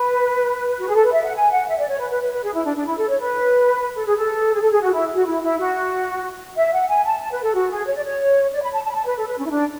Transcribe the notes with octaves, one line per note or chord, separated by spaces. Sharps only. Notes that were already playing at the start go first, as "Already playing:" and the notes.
Already playing: B4
F#4
G#4
A4
B4
E5
F#5
G#5
F#5
E5
D5
C#5
B4
B4
B4
B4
G#4
E4
D4
D4
E4
A4
C#5
B4
A4
G#4
A4
G#4
A4
G#4
F#4
E4
F#4
E4
E4
F#4
E5
F#5
G#5
A5
A5
B4
A4
F#4
G#4
C#5
D5
C#5
D5
B5
A5
A5
B5
A5
B4
A4
B4
C#4
E4
D4